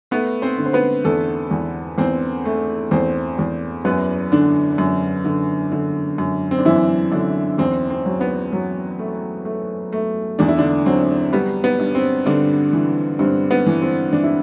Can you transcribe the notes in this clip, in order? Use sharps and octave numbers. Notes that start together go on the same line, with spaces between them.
A3 B3 B4
C4 C5
D3
C5
B3 B4
E2 A3 A4
E2
E2 C4 C5
A3
E2 C4 C5
E2
F#2 B3 B4
D3 D4
F#2
D3
D3
F#2
C4
D4
F#2 E3 E4
F#2 D3 D4
E2 C4
C4
F#3
B3
F#3
A3
A3
A3
E2 D4
E4
D3 D4
F#3 C4
G3 B3
B3
G2
C4
G2 D3 D4
E3
G2 C4
B3
E3
C4
E3 D4
E4